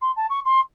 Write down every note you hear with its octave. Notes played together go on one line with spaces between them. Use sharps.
C6
A5
C#6
C6